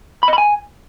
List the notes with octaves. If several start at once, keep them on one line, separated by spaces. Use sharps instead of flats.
B5
D#5
B5
G#5